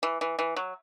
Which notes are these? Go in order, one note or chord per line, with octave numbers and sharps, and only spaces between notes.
E3
E3
E3
F#3